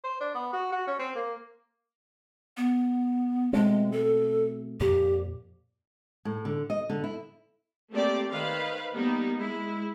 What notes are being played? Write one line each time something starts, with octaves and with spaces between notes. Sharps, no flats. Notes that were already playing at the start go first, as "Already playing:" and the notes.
C5
D4
B3
F#4
F#4
C#4
C4
A#3
B3
B2 G#3 A3 C4
A4
F2 A#2 G4
A2
D3
D#5
D3
E4
A3 A#3 C4 G4 D5
D#3 B4 C5 F5
G3 A#3 B3 D#4
G#3 E4